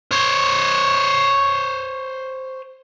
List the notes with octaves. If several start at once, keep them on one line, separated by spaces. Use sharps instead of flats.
C5 C#5